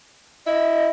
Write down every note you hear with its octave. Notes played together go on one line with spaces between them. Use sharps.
E4 D#5